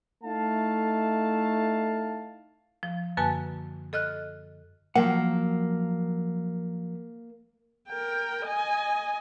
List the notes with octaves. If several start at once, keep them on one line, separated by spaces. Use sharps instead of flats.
A3 D#4 E4 F5 A5
F3
F#2 D3 A#3 B4 G#5 A5
A4 D#5 F6 F#6
F3 F#3 A#3 F#5
A#4 G5
D#5 G#5